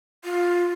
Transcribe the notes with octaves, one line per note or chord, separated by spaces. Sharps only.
F4